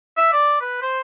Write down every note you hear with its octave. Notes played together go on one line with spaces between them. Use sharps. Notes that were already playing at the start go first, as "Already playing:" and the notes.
E5
D5
B4
C5